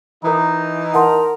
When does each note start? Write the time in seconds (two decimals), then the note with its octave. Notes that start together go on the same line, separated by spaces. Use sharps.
0.24 E3 D#4 A#4 A#5
0.94 A#4 F#5 A5 C6